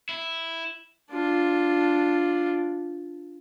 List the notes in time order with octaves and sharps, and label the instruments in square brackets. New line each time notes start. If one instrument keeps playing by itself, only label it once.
[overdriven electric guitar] E4
[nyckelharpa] D4 F4